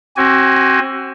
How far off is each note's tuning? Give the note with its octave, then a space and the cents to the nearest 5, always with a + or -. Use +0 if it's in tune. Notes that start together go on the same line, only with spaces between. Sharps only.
C4 +30 F#4 +35 G#5 +0